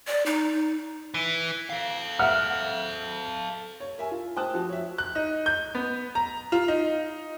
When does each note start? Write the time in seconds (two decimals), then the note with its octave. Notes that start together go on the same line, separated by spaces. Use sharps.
0.07 D5
0.26 D#4
1.14 E3
1.70 A4 F5
2.19 E5 F#5 F6
3.80 C#5
3.98 A#4 E5 G#5
4.11 F4
4.36 C5 G5 A5 D#6 F#6
4.54 F3 F#4
4.69 C#5 E5
4.98 F#6
5.15 D#4
5.46 G6
5.75 B3
6.15 A#5
6.52 F4
6.68 D#4